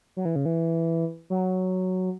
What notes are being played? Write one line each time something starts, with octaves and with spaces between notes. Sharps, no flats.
F#3
E3
C#3
E3
F#3